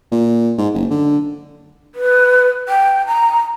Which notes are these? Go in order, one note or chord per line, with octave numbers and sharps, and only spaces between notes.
A#2
G#2
F#1
D3
B4
G5
A#5